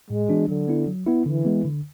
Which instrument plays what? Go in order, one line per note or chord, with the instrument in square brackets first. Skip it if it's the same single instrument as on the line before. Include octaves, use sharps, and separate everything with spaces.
[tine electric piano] A2 [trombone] G#3
[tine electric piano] E3 B3 D4 F#4
[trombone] D3 [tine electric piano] F#3
[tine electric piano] B3 E4
F#3
B3 E4
[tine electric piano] D3 [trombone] E3
[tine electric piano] G#3 B3
D3